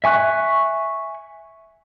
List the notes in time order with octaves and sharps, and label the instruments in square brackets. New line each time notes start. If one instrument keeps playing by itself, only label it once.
[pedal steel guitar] E5 G#5 C#6 F#6